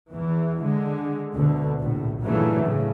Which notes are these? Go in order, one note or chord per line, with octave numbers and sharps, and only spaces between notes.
E2 E3
D3 G#3
D2 B2 D3
A#1 A2
G2 A#2 C#3 E3 F#3 A3
A2 C#3